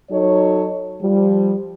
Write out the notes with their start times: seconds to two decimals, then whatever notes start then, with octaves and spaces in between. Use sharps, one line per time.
0.10 F#3 D#4 A4 C#5
1.01 F3 G3